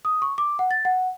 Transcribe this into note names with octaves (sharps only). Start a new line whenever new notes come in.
D#6
C#6
D6
F#5
A6
F#5